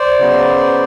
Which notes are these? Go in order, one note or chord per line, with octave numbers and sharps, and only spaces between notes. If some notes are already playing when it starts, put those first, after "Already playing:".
Already playing: C5 D5
C#3 F#3 B3